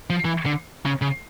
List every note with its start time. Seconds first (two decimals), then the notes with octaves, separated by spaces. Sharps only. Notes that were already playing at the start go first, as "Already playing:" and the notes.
0.10 F3
0.25 E3
0.46 D3
0.86 C#3
1.02 C#3